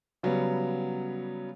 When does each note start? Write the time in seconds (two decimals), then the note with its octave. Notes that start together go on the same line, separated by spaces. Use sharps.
0.23 C#3 F#3 G3 B3